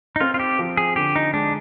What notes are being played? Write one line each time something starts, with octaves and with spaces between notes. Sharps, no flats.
D#4
C4 F4
F4
G4
F3
G#4
D3 G4
D#4
G#3 D4